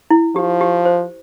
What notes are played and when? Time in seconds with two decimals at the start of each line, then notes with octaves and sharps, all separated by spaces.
0.10 E4
0.35 F3 G4
0.61 G4
0.85 C5